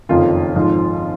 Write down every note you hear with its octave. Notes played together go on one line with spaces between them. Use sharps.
F#1 F2 D#3 F4
G#1 G#2 F3